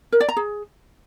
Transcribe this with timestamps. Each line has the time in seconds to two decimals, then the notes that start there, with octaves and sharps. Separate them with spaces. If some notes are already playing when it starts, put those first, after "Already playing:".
0.12 A#4
0.20 D5
0.29 A#5
0.37 G#4